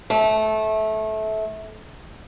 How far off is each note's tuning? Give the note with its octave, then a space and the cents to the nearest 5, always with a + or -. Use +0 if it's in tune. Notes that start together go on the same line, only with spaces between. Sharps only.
A3 -20